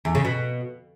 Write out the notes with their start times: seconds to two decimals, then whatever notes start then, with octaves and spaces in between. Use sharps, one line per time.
0.05 E2
0.15 C#3
0.25 B2